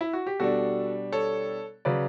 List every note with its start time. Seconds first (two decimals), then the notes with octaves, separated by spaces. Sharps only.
0.01 E4
0.13 F#4
0.27 G4
0.39 B2 G3 D4 F#4 A4
1.12 A4 C#5
1.85 C#3 F#3 B4 D5